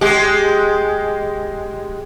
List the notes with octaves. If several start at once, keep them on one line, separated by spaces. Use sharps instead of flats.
G#3 G4